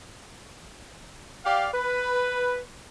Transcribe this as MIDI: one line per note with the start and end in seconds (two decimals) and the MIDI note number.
1.45 1.67 67
1.45 1.67 74
1.45 1.67 77
1.73 2.59 71